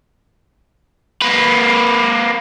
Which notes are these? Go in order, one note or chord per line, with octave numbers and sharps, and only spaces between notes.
A#3 B4